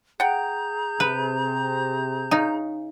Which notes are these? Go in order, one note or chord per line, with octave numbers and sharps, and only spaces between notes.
G#4 F#5 G5 A#5 G6
C3 B4
C#3 D#4